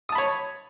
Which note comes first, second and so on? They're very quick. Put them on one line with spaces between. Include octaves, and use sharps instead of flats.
D#6 A5 B5 C#5